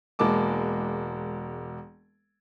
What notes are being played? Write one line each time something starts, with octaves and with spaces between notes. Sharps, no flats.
E1 G#3 A#3 A5 D6